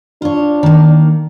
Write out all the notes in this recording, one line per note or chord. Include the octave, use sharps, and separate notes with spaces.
D4 F4 C#5
D#3 A#3